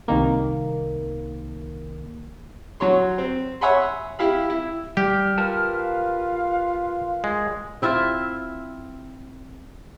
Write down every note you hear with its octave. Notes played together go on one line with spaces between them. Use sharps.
C2 D#3 A#3
F#3 F#4 C#5 C6
C4
C#5 E5 F#5 G#5 B5 C6
E4 G4 F5 B5
E4
G3 G4 F6
F4 A#4 B4 A5
F5
G#3
C4 E4 F4 E5